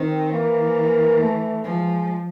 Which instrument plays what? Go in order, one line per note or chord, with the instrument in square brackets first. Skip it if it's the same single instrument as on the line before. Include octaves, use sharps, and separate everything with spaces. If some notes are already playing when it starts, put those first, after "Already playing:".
Already playing: [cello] D#3 [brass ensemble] C4
[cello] E3 [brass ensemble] A#3
[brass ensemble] A3
[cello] F3 [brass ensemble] G#3